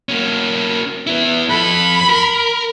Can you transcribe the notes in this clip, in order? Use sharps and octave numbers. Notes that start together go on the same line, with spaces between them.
A#3 C#4
B3 E4
F2 A4 B5
A#4